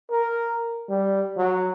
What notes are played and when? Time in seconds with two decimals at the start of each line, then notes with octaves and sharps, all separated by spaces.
0.11 A#4
0.89 G3
1.37 F#3